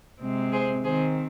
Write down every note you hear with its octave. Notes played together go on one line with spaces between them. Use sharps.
C3 G#3 C4
G#4 C5
D#3 C4 G#4 C5